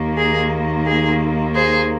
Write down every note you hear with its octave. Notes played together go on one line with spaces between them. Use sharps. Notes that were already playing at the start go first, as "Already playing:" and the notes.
Already playing: D#2 D#3 A#3
G#4
G#4
G#4 C5